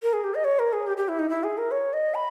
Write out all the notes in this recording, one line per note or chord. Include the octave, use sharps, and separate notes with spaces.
A#4
G#4
G4
D#5
C#5
A#4
G#4
G4
G4
E4
D#4
E4
G#4
A#4
C#5
D#5
B5